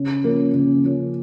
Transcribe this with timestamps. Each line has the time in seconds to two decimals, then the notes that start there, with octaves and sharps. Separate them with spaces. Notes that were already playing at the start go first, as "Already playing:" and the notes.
Already playing: C#3
0.24 F3 A#3 C#4
0.54 C#3
0.84 F3 A#3 C#4